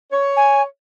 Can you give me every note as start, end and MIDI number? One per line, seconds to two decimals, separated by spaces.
0.12 0.63 73
0.36 0.62 80